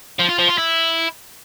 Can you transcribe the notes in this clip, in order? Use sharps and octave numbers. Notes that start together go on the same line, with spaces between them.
F3
F4
F3
F4
E4